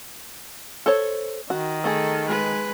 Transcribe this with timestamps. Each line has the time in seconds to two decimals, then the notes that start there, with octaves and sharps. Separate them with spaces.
0.86 A4 C5 C#5
1.50 D#3 F#4
1.84 A3 G#4 A4
2.26 G#3 B4